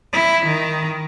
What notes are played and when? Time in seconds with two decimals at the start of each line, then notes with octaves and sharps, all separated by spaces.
0.13 E4
0.46 D#3